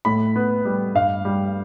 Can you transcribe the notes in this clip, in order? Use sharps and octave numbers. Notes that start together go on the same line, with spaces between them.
A2 B5
B3
G3
G2 F5
G3